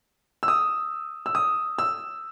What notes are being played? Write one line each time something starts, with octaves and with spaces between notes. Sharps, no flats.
E6
D#6
E6
D#6
E6